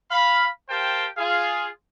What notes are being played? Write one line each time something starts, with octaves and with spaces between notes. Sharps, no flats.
F5 B5
G4 A#4 C5 F5 G5 A5
F4 G#4 F5